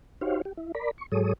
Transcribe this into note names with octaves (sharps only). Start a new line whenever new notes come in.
D#4 F#4 G4 C5 C#5 F5
G4
E4
A#4 D5 B5
C#6
G#2 F#3 G#4 A4 C#5 D#6